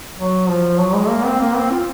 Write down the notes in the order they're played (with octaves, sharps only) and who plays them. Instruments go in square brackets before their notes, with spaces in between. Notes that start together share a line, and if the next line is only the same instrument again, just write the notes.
[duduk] F#3
F3
F#3
G#3
A#3
C4
A#3
C4
F4